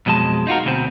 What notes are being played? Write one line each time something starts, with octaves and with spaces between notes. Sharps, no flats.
B1 F2 B2 G#3 A5
D#4 F4 F#4 A#4
D2 B2 C4